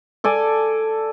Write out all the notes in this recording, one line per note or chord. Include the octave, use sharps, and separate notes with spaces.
A4 D5 G#5